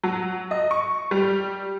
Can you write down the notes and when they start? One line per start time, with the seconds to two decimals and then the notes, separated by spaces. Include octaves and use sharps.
0.03 F#3
0.51 D#5
0.71 C#6
1.11 G3